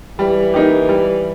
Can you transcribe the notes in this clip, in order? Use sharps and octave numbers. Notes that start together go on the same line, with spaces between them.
E3 G3
A#3 D#4 G4
G3